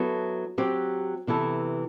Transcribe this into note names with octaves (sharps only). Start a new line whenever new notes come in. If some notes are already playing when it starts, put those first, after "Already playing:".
Already playing: F#3 B3 E4 A4
F#3 C4 G4
C3 E3 B3 E4 A4